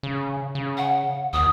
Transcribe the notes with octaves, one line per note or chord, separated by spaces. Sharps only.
C#3
C#3
F#5
D#2 D#6